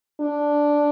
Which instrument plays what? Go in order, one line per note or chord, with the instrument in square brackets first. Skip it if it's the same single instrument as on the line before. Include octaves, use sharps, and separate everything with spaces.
[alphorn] D4